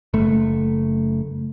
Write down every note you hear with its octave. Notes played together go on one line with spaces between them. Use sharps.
F#1 A3